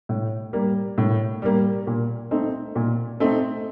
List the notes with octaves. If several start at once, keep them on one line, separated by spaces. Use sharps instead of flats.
A2
G3 A#3
A2
G3 A#3
A#2
A3 C4 D#4
A#2
A3 C4 D#4